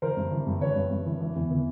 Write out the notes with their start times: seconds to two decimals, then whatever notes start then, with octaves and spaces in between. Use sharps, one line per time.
0.02 E3 A#4 C5
0.17 G2
0.32 E3
0.47 G2
0.61 E3 B4 C#5
0.76 G2
0.91 G2
1.06 E3
1.21 E3
1.35 E2
1.51 E3